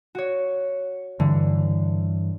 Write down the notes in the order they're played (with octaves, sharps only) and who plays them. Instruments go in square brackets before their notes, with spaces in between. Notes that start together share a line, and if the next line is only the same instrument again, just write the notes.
[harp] F#4 C#5
[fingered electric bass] G2 E3 [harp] D3